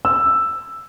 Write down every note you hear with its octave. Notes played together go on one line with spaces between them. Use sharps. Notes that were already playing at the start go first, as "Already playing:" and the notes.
E6